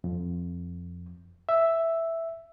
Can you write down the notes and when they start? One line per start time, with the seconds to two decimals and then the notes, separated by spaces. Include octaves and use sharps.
0.04 F2
1.49 E5